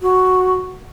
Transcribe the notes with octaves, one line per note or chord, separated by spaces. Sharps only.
F#4